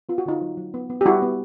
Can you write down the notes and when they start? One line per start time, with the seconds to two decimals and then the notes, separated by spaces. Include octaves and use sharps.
0.09 B3 F4
0.18 F#4
0.26 D3 D#4 F4
0.42 F#3
0.57 F#3
0.74 B3
0.89 B3
1.01 G4
1.05 G3 E4 F#4
1.22 B3